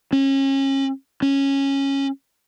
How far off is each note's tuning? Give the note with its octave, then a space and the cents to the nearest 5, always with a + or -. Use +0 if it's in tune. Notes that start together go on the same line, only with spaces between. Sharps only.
C#4 -30
C#4 -10